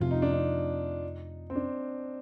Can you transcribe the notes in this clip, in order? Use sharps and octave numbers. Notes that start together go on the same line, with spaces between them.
F2 C3 F3 A3 F4
D#4
D4
D#4
C4
D4